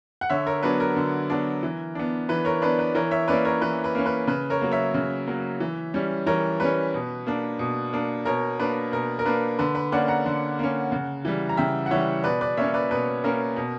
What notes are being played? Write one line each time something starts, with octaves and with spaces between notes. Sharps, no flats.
F#5
D3 C#5 E5
A#4 C#5
F#3 B3 D4 B4
A#4
D3
F#3 B3 D4
E3
B3 D4
E3 B4
A#4 C#5
B3 D4 B4 D5
B4
E3 A#4 C#5
C#5 E5
A#3 C#4 B4 D5
A#4 C#5
E3 B4
B4
A#3 C#4
B4
C#3 B4
A#4 C#5
F#3 A#3
C#5 E5
C#3
F#3 A#3
E3
G3 C#4
E3 A#4 C#5
G3 C#4 B4
B2
A#3 D4
B2
A#3 D4
B2 A#4 C#5
A#3 D4 B4
B2 A#4
A#4
A#3 D4 B4
D3 B4
B4
A#3 C#4 D5 F#5
F#5 A#5
D3
A#3 C#4
C#3
E3 G3
A#5
C#3 E5 G5
F#5
E3 G3 C#5 E5
B2 B4 D5
B4 D5
A#3 C#4 C#5 E5
B4 D5
B2 B4
A#3 C#4 A#4
B2